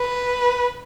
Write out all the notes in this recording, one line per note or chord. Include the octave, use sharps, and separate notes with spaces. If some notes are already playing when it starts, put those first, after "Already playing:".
Already playing: B4